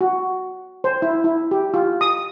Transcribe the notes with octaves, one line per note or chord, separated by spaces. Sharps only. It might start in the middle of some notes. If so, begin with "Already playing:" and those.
F#4
C5
E4
E4
G4
F4
D#6